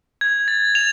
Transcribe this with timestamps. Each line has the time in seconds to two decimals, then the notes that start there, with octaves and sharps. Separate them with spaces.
0.21 G#6
0.48 A6
0.75 F7